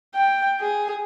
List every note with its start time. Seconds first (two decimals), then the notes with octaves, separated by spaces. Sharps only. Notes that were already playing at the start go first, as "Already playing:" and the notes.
0.15 G5
0.60 G#4